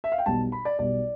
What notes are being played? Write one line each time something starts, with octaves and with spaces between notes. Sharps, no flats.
E5
F5
G5
B1 B2 G3 A5
B5
D5
B1 B2 G3 D5